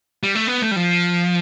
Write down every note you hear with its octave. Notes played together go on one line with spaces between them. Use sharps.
G3
A3
B3
A3
G3
F3